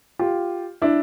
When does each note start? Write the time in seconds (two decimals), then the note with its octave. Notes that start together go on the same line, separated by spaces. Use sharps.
0.19 F4 G4
0.82 D4 E4